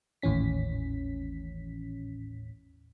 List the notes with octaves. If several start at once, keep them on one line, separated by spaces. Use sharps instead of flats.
G#1 D#2 A2 E3 C#4 B6